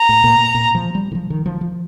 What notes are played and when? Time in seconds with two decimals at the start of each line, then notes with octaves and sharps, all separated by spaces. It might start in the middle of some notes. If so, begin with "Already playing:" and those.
Already playing: A#5
0.09 A2
0.24 A#2
0.54 A#2
0.75 F3
0.95 G3
1.12 D#3
1.15 F3
1.30 D#3
1.46 F3
1.61 F3